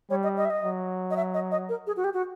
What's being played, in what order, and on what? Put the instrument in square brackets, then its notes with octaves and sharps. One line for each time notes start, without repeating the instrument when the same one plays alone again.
[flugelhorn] G3 [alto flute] C#5
[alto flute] D#5
D#5
E5
D#5
[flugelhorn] F#3
[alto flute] D#5
E5
D#5
D#5
A#4
G#4
F#4
G4
F#4